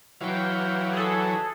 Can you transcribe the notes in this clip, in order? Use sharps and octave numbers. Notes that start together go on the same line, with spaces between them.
E3 F#3 F5 G5
G#4 A4